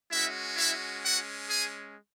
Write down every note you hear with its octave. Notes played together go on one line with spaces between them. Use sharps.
G#3 C#4 E4 F#4 E5
E4 E5
F#4 F#5
G#4 G#5